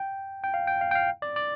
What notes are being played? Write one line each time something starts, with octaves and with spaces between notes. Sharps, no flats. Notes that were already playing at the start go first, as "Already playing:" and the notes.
Already playing: G5
G5
F5
G5
F5
G5
F5
D5
D5